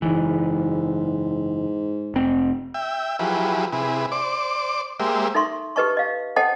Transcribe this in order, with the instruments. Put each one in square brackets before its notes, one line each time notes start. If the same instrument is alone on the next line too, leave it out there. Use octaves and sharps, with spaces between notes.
[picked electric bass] F#1 C#2 E3 [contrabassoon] G#2
[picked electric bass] F1 C4
[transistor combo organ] E5 G5
F3 F#3 E4 G4 G#4 B4
C3 E4 G#4 B4
C5 D5 D6
G#3 A#3 G4 C5 E5
[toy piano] D#4 A4 E5 C6 C#6
G4 A4 B4 D#5 A5 C#6
D#5 F5
A4 C5 D#5 F#5 G5 A5